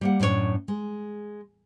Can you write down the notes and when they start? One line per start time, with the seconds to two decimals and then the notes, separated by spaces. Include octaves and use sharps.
0.01 G3 A#3 F#5
0.20 F#2 A2 D4 F4 C#5
0.68 G#3